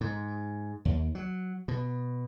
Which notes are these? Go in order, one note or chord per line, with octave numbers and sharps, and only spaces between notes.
G#2
D#2
F#3
B2